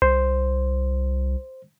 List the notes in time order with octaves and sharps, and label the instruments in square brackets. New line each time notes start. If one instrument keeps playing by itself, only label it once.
[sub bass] C2 [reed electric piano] C5